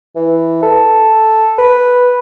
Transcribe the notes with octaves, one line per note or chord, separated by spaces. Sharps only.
E3
A4
B4